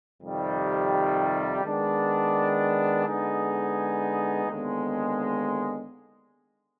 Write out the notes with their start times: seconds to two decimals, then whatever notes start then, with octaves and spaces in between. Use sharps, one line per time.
0.22 F2 C3 D#3 G3
1.64 D#3 G#3 B3 D4
3.05 D3 G#3 B3 D#4 G#4
4.47 D#2 D3 G#3 B3